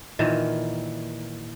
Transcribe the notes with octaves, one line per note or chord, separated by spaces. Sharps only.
A#2 D#3 E3